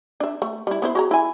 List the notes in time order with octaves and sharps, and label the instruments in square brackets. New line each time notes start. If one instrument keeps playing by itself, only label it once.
[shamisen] D4 E5
A3
G3 E4
B3 E4 C5
F#4 G#4 A#5
E4 G#5